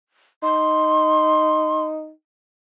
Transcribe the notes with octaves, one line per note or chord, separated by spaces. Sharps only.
D#4 C6